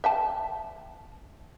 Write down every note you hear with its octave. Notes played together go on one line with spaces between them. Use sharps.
E5 G5 A5